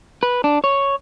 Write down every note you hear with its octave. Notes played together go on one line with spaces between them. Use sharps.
B4
D4
C#5